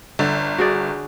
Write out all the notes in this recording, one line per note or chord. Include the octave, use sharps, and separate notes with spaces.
G1 D3
F#4 G#4 D5